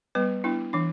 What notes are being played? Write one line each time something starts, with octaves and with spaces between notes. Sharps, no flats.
G3 B3 B4
B3 D4 E4
E3 D4